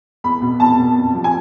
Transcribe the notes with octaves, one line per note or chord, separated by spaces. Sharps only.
E2 B5
B2
E2 A5
B2
F2
C3 F3
G#5